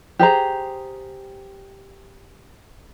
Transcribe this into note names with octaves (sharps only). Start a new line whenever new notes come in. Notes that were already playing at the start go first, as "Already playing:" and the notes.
G4 G#4 C5 A#5